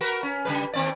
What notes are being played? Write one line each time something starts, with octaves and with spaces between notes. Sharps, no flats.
F#4 A#4 B4
C#4
C#3 G3 B4
D#2 C4 D5